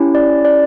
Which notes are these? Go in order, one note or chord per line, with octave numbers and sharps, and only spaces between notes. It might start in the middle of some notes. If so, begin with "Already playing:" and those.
Already playing: C#4 E4 G4
D5
D5